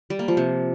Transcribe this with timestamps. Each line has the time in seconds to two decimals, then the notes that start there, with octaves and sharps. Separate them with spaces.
0.10 G3
0.19 A#3
0.28 F3
0.37 C3